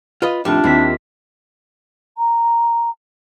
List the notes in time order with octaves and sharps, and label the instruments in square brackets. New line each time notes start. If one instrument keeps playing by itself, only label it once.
[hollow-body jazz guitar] F4 B4 D#5
[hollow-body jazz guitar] F2 A2 D#3 [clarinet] D4 [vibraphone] F4 E5 [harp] G4
[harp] D#2 C4 B6 [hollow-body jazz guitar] E4
[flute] A#5